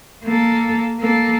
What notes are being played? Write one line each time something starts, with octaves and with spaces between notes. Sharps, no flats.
A#3 A4
A#3 A4